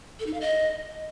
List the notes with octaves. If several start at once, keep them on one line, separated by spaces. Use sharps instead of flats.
A4
D#4
F5
D#5